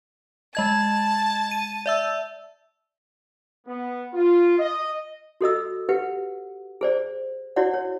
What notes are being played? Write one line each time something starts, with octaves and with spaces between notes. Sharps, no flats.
G#3 D#5 A5 G#6
D#7
D5 E5 E6
B3
F4
D#5
F#4 A4 D#5 E6
G4 B4 F#5
G#4 C5 D5
E4 F#4 C#5 D5 F#5
C#5